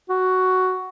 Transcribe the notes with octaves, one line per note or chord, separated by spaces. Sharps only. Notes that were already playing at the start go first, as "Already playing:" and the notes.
F#4